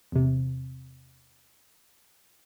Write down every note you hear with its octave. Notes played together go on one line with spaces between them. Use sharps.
E2 C3